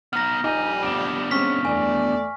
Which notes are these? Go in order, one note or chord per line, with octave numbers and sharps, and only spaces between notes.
B3 D#4 F6 A#6
A#1 F2 G3 D4 D#4 D#5 G#5
B3 D4 D7 E7
G#3 C4 C#4 C#6 F6 B6
E2 A3 D5 G#5